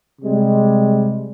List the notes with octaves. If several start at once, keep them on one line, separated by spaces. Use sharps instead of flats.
C3 G3 G#3